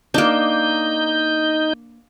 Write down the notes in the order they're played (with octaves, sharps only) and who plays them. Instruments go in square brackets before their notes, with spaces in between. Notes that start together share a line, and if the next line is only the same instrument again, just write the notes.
[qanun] A#3 D4 [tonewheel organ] D#4 G6